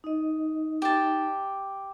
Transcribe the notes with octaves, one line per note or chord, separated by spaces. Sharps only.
D#4 D#5
G4 A5